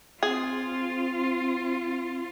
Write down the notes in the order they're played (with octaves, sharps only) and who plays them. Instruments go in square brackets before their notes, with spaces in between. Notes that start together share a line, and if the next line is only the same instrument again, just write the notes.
[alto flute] C4 [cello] F4 [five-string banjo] G#4